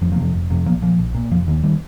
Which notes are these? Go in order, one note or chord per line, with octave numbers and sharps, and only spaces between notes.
F1 F3
F3 A#3
F2 C3
F1
F2 C3
A#1 F3 A#3
A#2 F3
A#1
A#2
F1 F3
D#2 D#3
D#3 G3